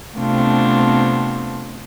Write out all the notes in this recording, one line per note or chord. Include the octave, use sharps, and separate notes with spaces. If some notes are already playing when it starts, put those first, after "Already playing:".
C3 A3 B3 C4 D4 F4